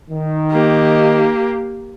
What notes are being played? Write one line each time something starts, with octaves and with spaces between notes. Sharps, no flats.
D#3
A#3 G4